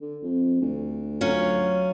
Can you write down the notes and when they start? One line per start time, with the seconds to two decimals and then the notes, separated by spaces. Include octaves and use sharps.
0.01 D3
0.23 F2
0.61 D2
1.21 F#3 C#4 F4